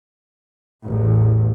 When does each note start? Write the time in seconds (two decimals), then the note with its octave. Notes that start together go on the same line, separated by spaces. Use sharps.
0.84 A1 E2